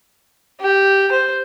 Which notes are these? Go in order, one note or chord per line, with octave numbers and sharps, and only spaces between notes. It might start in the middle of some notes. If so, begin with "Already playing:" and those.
G4
C5